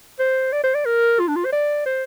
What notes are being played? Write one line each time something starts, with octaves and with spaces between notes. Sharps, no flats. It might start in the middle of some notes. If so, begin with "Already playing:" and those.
C5
D5
C5
D5
A#4
F4
D4
F4
C5
D5
C5